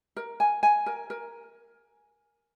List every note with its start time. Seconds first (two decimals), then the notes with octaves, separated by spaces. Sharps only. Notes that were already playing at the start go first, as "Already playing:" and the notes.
0.17 A#4
0.40 G#5
0.63 G#5
0.86 A#4
1.10 A#4